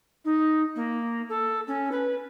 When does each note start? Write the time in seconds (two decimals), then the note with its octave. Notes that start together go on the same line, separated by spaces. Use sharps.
0.25 D#4
0.75 A#3
1.29 A4
1.67 C#4
1.91 B4